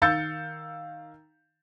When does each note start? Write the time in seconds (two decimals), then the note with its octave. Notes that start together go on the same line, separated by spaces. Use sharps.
0.02 D#3 F5 E6 G6 A6 C#7